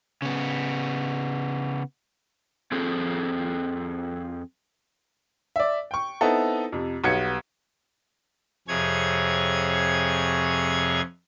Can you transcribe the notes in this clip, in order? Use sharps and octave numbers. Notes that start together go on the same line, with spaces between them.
C#3 B3
F2 F3 C4 G#4 A4
D5 E5
G5 C#6
B3 C4 D#4 E4 A4
F2 C3
B1 G3 B3 G#6 C#7
F2 C3 G#4 C#5 G#6